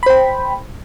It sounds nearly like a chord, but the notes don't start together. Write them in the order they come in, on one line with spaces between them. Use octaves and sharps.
B5 C5 G5